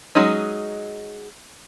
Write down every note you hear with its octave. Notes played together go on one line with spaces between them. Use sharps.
F#3 G#3 C#4 D#4